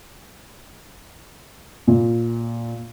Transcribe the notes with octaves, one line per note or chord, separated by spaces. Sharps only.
A#2